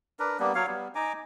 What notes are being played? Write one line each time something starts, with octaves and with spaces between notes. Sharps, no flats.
D4 A#4 B4
G3 A#3 B3 D4
F#3 C#5 F5
G3 B3
D#4 G#5 A#5 D6